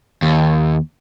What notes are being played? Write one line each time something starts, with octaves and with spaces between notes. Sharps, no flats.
D#2